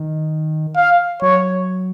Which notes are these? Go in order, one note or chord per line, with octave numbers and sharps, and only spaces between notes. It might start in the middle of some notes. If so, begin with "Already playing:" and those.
Already playing: D#3
F5
F#3 C#5